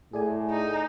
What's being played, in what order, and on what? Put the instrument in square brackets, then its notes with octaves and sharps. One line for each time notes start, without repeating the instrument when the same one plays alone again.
[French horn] A2 [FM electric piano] G#4 D5 G#5
[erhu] D#4